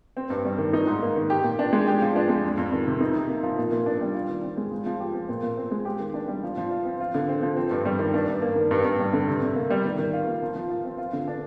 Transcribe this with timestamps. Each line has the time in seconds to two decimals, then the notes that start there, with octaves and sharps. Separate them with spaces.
0.17 C4
0.30 G2
0.45 G3
0.58 D#3
0.73 D#4
0.87 G#2
1.02 A#3
1.16 D#3
1.30 G4
1.44 A#2
1.59 D4
1.73 G#3
1.87 G4
2.02 F3
2.16 D4
2.29 G#3
2.44 F2
2.58 F2
2.73 D#3
2.87 C3
3.01 D#4
3.15 C3
3.29 A#3
3.43 F3
3.58 A#2
3.72 A#2
3.86 D4
4.01 G3
4.14 F4
4.29 D#3
4.43 C4
4.57 G#3
4.71 F3
4.86 F3
5.00 G4
5.14 C4
5.29 A#2
5.42 A#2
5.57 C4
5.71 G#3
5.85 G4
6.00 D#3
6.14 D4
6.28 G3
6.43 F3
6.57 F3
6.71 F4
6.85 C4
7.00 F4
7.15 D3
7.29 C4
7.43 F3
7.56 C4
7.71 G2
7.85 G3
7.99 D#3
8.14 D4
8.28 G2
8.42 A#3
8.56 D#3
8.71 G2
8.85 G2
8.99 G3
9.13 D3
9.28 C3
9.41 C3
9.55 A#3
9.70 G3
9.85 D#3
9.98 D#3
10.13 F4
10.27 A#3
10.42 F3
10.56 F3
10.69 F4
10.85 C4
10.98 F4
11.13 D3
11.28 D4